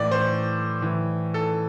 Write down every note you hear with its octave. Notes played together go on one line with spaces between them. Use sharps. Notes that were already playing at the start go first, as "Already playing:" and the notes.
Already playing: A2 E3 D5
C5
A2 E3
A4